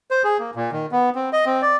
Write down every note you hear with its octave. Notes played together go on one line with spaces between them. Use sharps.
C5
G#4
A#3
A#2
D#3
B3
C4
D#5
C4
D5